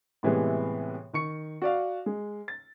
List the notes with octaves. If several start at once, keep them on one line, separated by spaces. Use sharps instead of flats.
A2 C3 E3 G3 G#3 B3
D#3 C#6 C#7
F#4 D5 F5
G#3
A6